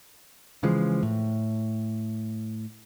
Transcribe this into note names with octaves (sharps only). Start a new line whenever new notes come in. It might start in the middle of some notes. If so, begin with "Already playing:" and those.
C#3 E3 F3 G#3
A2